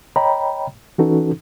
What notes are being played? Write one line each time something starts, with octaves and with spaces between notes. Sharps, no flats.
C#5 D#5 G5 A#5 B5
E3 C#4 D#4 F#4 A4 B4